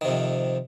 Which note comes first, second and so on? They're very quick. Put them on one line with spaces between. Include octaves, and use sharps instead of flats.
D#3 C3 F2